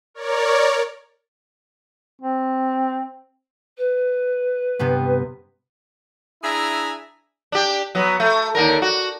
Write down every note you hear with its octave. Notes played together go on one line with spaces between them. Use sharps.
A#4 C#5 D5
C4
B4
G2 C3 B3
D4 E4 G#4 E5 G#5 A#5
D4 G4
F#3 B3
A3
D#2 D3 A#4
F#4